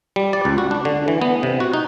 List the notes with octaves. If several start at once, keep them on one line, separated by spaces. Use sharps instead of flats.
G3
D5
C#2
F#4
D4
D3
E3
B3
C3
F#4
D#4